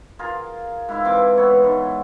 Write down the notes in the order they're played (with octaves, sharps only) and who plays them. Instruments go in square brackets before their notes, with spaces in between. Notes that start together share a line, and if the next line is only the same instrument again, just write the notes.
[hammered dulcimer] F4 G#4 A#4
G#2 E4 F5
E3 C4 D6
B3 C#5
G#2